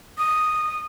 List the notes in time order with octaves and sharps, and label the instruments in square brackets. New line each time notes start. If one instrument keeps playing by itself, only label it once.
[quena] D#6